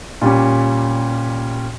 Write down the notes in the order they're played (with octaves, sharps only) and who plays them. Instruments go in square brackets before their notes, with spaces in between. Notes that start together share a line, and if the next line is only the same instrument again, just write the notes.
[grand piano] A#2 G3 C#4